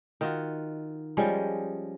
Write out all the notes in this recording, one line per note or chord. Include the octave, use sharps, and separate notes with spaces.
D#3 F4 F#4
F3 G3 G#3 C#4